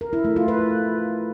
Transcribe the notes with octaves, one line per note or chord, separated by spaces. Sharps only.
A#4
E4
A3
F4
B4